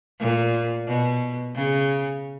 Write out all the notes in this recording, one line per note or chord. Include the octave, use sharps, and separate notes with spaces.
A#2
B2
C#3